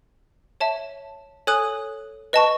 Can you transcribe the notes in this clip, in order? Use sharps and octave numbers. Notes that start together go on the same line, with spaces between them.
C#5 E5 A5
A4 C#5 G#5 D#6 F#6
B4 D#5 A5 C#6